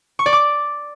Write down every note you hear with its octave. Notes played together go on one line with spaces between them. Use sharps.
C#6
D5
D6